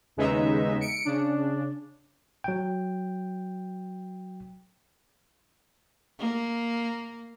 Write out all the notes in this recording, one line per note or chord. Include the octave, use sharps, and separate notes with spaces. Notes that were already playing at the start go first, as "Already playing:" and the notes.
D#2 C#3 G#3 B3 D#4 E5
C#7 D7
C#3 D4
F#3 G5
A#3